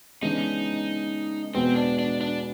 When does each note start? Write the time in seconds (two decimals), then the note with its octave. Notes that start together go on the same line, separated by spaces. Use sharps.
0.22 C#3 E3 G#3 B3 D4 D#4
1.54 E2 B2 G#3 B3 C4
1.76 D4
1.99 D4
2.21 D4